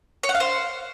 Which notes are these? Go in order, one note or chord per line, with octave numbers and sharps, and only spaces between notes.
C#5
F#5
F5
C5